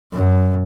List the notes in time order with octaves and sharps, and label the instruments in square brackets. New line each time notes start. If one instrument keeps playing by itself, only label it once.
[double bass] F#2